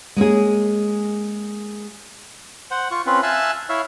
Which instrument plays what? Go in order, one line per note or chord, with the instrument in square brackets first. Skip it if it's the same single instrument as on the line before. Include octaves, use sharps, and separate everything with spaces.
[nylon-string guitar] G#3 A#3 C#4 G#4
[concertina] C5 F#5
F4 C#6
C4 C#4 F4 B4
E5 F5 G#5 A5 E6 F#6
E4 C#5 E5 F5